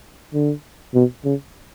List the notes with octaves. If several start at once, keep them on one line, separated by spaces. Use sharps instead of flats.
D3
B2
C#3